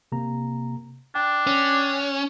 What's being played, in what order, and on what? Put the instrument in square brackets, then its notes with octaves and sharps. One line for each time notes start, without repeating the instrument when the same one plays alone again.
[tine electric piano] C3 A#3 A#5
[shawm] D4 [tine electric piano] G5
[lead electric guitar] C#4